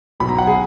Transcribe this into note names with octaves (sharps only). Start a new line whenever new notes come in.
B1 B2 F#3 B5
A#5
F#5
G#4